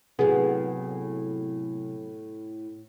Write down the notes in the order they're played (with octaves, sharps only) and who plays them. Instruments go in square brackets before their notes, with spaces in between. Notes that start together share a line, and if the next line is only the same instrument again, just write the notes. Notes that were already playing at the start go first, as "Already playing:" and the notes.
[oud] A2 B3 [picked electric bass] C3 F#3 [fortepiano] G#4